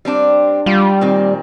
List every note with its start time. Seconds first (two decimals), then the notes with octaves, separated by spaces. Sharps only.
0.05 G3 C4 D4
0.66 G3 F4
1.01 A#2 D#3 C4